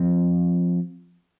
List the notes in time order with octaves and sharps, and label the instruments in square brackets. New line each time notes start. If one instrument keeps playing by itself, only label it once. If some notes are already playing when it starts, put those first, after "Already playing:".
Already playing: [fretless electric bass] F3 C4